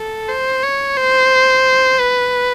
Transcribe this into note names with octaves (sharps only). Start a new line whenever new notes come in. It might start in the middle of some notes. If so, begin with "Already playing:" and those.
Already playing: A4
C5
C#5
C5
B4